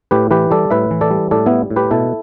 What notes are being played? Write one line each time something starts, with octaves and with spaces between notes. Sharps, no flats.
A2 G4 B4
E3 G4 B4
G3 A4 D5
A2 B4 E5
E3
A4 D5
G3
A2 A4 D5
G3 B3 E4
A2
G4 B4
B2 E4 A4